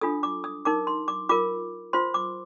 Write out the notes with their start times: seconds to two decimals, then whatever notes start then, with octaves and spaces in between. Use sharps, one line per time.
0.01 D4 F4 A4 D#6
0.23 D6
0.44 D#6
0.65 D#4 A#4 D6
0.87 C6
1.08 D6
1.29 F4 A#4 D6
1.93 F4 C5 C6
2.14 D6